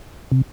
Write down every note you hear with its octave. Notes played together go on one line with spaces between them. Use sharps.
C3